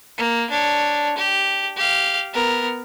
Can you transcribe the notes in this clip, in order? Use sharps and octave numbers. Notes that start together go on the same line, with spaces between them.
A#3
D4 C#5
G4
G4 F5
B3 A#4